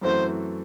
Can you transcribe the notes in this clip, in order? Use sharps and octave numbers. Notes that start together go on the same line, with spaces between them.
F#2 E3 A3 C4 F#4 C5